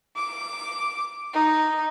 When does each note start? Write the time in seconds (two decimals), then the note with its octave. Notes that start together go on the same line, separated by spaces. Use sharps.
0.16 D6
1.34 D#4